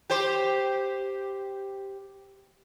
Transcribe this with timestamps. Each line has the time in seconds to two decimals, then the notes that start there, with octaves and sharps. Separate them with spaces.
0.10 G4 C5